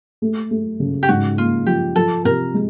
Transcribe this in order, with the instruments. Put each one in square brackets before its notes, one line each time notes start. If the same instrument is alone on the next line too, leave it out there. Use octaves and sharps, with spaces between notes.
[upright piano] A3
A3
C#3
[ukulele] G4
[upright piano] G#2 [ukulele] F#4
[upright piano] A#3 [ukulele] F4
[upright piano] F3 [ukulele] G4
[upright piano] F3 [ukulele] A4
[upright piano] C3 [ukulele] A#4
[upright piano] G#3